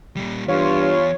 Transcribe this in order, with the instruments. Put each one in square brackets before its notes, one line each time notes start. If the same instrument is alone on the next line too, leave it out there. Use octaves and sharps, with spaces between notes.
[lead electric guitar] A#2 G3
[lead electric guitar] E2 [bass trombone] G2 [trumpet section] F4 [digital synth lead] C#5